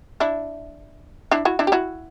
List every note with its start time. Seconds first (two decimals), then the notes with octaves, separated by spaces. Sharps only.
0.20 D4 E4
1.31 D4 E4
1.45 E4 F#4
1.59 D4 E4
1.67 G4
1.72 E4 F#4